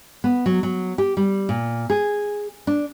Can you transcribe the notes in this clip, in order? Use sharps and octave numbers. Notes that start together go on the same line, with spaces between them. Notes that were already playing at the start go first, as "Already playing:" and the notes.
B3
F#3
F#3
G4
G3
A#2
G#4
D4